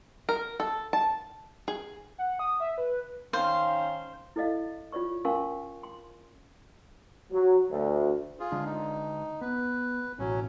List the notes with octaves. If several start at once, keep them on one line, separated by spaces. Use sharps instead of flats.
A#4
A4
A5
G#4
F#5
D#6
E5
B4
D#3 C#4 C5 F5
E4 A4 D5 D#5 F5
F4 C#5 D5 C#6
C#4 A#4 F5 G#5 C6 C#6
C6
F#3
D2
F4 G#4
D3 G#3 D4
D#4
B3 B4
A1 B2 F#3 C#4